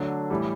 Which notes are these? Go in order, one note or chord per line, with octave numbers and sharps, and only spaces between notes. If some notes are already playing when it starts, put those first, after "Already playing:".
Already playing: D3 F#3 A3 D4
A2 E3 G3